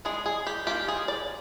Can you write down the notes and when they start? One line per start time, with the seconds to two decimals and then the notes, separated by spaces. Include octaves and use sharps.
0.05 D#3 G#3 D4 G#4
0.26 G#4
0.47 G4
0.67 D#3 A#3 F4 G4
0.88 G#4
1.08 D5